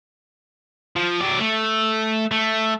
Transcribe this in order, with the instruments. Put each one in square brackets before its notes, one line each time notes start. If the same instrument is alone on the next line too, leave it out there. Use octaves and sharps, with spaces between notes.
[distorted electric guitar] F3
F#3 D5
A3
A3